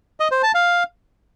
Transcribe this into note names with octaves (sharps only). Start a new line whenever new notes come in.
D#5
C5
A5
F5